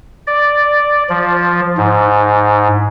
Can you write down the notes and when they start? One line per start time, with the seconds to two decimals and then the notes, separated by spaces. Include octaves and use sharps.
0.27 D5
1.09 F3
1.77 G#2